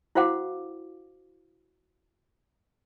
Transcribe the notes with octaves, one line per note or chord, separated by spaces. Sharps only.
E4 F#4 C5 F5 F#5 D6